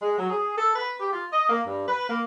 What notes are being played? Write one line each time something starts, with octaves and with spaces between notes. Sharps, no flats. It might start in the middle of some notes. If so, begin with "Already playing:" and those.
G#3
F#3
G#4
A4
B4
G4
F4
D#5
A#3
G2
B4
A#3